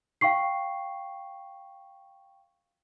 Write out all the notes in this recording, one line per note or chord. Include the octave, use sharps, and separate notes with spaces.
F5 G5 C#6 C7